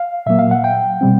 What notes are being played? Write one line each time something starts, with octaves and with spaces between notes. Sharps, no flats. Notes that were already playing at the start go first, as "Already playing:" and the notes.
Already playing: F5
A#2 F#3 A#3 E5
F5
F#5
G5
B2 G3 C4